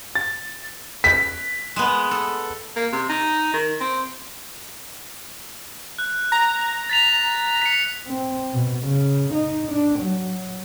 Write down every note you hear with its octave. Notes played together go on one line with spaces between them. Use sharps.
A6
B6
G#3 B3
A4
A#3
C3
D#4
D#3
C4
F#6
A#5
A6 B6 F7
B6 C#7
C4
B2
C#3
D#4
D4
F#3